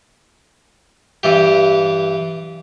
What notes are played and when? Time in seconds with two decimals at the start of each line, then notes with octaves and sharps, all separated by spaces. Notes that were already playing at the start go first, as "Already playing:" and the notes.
1.23 G2 E3 G4